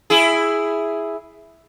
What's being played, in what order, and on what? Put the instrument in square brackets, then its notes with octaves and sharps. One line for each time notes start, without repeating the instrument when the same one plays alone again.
[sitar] E4 G#4